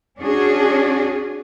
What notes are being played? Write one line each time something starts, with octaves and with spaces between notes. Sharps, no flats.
C#4 D4 F#4 G#4